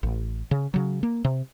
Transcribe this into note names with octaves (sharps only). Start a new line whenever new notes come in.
A1
C#3
C#3 F#3
A#3
C3